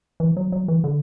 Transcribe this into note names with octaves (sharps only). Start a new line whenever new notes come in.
E3
F#3
F#3
E3
D3